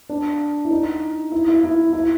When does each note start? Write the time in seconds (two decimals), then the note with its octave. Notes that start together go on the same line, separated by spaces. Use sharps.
0.09 D4
0.65 E4
0.71 D#4
1.32 E4
1.48 E4
1.63 E4
1.93 E4